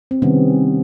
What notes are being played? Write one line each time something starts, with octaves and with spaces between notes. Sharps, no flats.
C4
C3 D#3 G3 B3 C#4